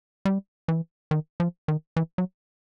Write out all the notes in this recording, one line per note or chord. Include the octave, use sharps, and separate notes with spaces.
G3
E3
D#3
F3
D#3
E3
F#3